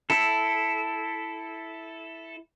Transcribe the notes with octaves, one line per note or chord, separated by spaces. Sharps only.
E4 A4